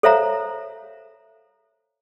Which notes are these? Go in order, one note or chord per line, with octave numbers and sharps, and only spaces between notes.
A4 C5 C#5 E5 F5 A#5